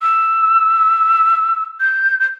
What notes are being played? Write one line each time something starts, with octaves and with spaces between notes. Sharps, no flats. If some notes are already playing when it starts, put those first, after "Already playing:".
E6
G6
G6